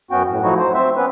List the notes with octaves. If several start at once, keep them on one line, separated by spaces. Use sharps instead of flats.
F#2 B3 C#4 F#4 G5
A2
F3 F#3 A3 D#4 E4 F#4
C5
C4 C5 E5
B3 C#4 B4